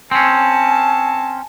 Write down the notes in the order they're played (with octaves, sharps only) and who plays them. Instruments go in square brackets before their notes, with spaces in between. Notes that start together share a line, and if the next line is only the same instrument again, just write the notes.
[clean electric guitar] C4 C#4 [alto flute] G#5 [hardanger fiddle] A5